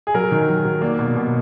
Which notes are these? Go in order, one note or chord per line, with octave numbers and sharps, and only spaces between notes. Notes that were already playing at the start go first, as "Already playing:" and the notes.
G#4
F#3 A#4
D#3
F#3
F#3
A#3 D5
B2
B2